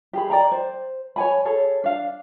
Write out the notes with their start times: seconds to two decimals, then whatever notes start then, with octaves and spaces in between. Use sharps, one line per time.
0.13 G4 G#4 B5
0.30 D5 G5 A#5
0.52 C5
1.16 C#5 F#5 G#5 B5
1.45 G#4 A4 C#5
1.84 D4 F5